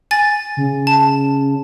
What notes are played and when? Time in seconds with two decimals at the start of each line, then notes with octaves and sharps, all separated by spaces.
0.11 G#5 A6
0.57 C#3
0.87 A5